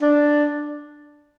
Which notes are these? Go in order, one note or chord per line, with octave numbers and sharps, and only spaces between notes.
D4